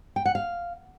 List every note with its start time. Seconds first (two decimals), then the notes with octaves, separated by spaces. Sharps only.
0.16 G5
0.26 F#5
0.35 F5